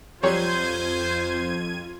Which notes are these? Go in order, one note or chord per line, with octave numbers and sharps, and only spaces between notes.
F2 F#3 G3 F4 C5 C#5 G#6 D#7